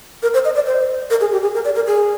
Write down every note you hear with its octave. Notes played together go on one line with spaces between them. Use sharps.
A#4
C5
D#5
D5
C5
A#4
G#4
G4
G#4
A#4
D5
A#4
G#4